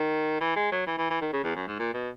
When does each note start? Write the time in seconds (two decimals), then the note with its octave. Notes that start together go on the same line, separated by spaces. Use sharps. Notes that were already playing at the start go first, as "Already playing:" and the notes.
Already playing: D#3
0.41 E3
0.56 G#3
0.72 F#3
0.87 E3
0.98 E3
1.10 E3
1.21 D#3
1.33 C#3
1.44 E2
1.55 F#2
1.67 G#2
1.79 A#2
1.94 B2